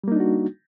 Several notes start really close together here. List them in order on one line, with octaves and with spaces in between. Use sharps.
G3 A#3 D#4 D4 F#4